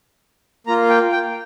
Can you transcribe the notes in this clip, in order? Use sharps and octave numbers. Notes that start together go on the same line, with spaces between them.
A#3 F4 A#5
G5
G5